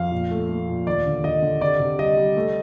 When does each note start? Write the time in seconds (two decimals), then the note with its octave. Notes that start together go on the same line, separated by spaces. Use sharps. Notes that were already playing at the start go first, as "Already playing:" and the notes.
Already playing: F2 F5
0.12 A#2
0.31 A3
0.49 A3
0.69 A#2
0.87 D#2 D5
1.06 D3
1.23 D3 D#5
1.42 D3
1.61 C3 D5
1.80 C3
1.99 G3 D#5
2.17 G3
2.37 A3